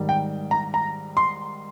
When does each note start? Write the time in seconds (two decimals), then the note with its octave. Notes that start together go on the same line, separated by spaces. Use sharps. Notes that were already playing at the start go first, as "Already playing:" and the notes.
Already playing: G#2 D#3 G3
0.09 G5
0.51 A#5
0.74 A#5
1.17 C6